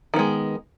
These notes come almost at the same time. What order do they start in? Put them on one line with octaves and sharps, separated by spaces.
D#3 B3 G#3